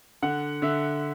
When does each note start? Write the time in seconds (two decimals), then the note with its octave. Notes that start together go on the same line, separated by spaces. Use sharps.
0.22 D3 F#5
0.62 D3 E5